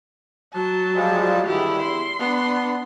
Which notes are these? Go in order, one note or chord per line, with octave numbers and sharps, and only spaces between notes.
F#3 A5
F3 G3 G#3
G2 D3 D#3 E4 G4 G#4
E2 C6
B3 D4